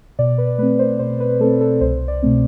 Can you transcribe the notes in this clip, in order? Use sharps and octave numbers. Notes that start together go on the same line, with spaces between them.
B2 D5
B4
A3 C4 B4
C5
B2 C5
B4
A3 C4 A4
A4
C2 C5
D5
B2 A3 C4